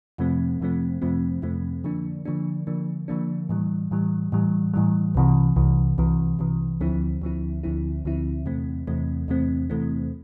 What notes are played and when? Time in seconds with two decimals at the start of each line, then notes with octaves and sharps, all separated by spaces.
0.18 F2 C3 F3 A3 C4
0.60 F2 C3 F3 A3 C4
1.02 F2 C3 F3 A3 C4
1.42 F2 C3 F3 A3 C4
1.84 D3 F3 A#3 D4
2.25 D3 F3 A#3 D4
2.67 D3 F3 A#3 D4
3.08 D3 F3 A#3 D4
3.49 A2 E3 G3
3.91 A2 E3 G3
4.32 A2 E3 G3
4.74 A2 E3 G3
5.15 C2 C3 E3
5.56 C2 C3 E3
5.98 C2 C3 E3
6.39 C2 C3 E3
6.81 D2 D3 F3 C4 E4
7.22 D2 D3 F3 C4 E4
7.63 D2 D3 F3 C4 E4
8.04 D2 D3 F3 C4 E4
8.46 E2 C3 E3 A3 C4
8.87 E2 C3 E3 A3 C4
9.28 E2 C3 E3 A3 C4
9.70 E2 C3 E3 A3 C4